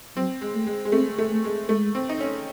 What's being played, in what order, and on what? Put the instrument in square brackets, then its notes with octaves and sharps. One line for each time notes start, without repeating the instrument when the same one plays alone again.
[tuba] F#3 [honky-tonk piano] C4
[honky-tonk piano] G#3
[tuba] A3
[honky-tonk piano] G#3
G#3
[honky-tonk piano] A3 [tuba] C4
[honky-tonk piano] A3
[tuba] A3
[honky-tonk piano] G#3
[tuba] G#3 [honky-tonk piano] A3
[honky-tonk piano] C4
D#4
C#4